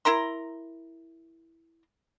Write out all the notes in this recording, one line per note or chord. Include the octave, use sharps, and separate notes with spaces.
E4 A#4 A#5 C6